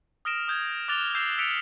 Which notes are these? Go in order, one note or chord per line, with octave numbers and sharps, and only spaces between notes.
D#6 F6 A#6 D7 E7
D#6 G6 G#6
D6 F6 F#6 A6 F7 G7
E6 G6 C7 E7
E6 B6 C#7 D7 F7